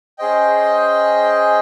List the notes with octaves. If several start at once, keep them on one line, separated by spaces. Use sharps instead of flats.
C#4 G#4 C5 D#5 G5